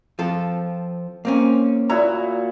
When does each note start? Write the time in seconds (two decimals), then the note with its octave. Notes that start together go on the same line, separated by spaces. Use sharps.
0.19 F3 C4 A4
1.25 A#3 C4 C#4
1.90 A#2 E4 F#4 A#5